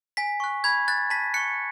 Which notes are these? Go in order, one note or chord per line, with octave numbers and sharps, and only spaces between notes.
G#5 B6
C#6 F#6
B5 G#6
F#6 A6
A5 B6
C#6 F#6 C#7